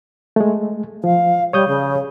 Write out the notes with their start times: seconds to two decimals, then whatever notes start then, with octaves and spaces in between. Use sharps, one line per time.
0.36 G#3 A3
1.04 F3 F5
1.53 G3 C#5 D#6 G6
1.68 C#3